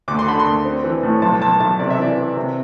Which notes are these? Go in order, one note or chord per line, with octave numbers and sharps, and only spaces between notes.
D2 D6
C6
D3 B5
C6
D2
C4
E3
A2
B1 A5
B1 A5
B1 A5
C3 D5
E5
E3 D5
E3
C3